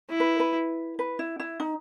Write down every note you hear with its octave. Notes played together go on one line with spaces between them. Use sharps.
E4
B4
B4
B4
E4
E4
D#4